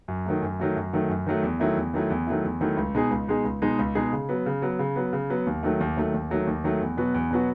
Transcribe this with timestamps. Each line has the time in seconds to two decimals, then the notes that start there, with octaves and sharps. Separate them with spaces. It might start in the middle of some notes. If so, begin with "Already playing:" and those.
0.08 F#2
0.26 D#3 F#3 A3
0.42 F#2
0.60 D#3 F#3 A3
0.76 F#2
0.93 D#3 F#3 A3
1.09 F#2
1.26 D#3 F#3 A3
1.43 E2
1.60 D#3 F#3 A3 E4
1.77 E2
1.94 D#3 F#3 A3 E4
2.10 E2
2.27 D#3 F#3 A3 E4
2.45 E2
2.61 D#3 F#3 A3 E4
2.77 C#2
2.95 B2 G#3 D#4 G#4
3.11 C#2
3.28 B2 G#3 D#4 G#4
3.44 C#2
3.62 B2 G#3 D#4 G#4
3.79 C#2
3.95 B2 G#3 D#4 G#4
4.13 C#3
4.29 F#3 B3
4.46 C#3
4.62 F#3 B3
4.79 C#3
4.96 F#3 B3
5.13 C#3
5.30 F#3 B3
5.47 D#2
5.63 D#3 F#3 A3
5.81 D#2
5.97 D#3 F#3 A3
6.14 D#2
6.30 D#3 F#3 A3
6.47 D#2
6.64 D#3 F#3 A3
6.81 E2
6.97 B2 F#3 B3 F#4
7.14 E2
7.31 B2 F#3 B3 F#4